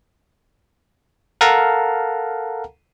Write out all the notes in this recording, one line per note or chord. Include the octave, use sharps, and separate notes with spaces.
A4 A#4 F5 F#5 A5 A#5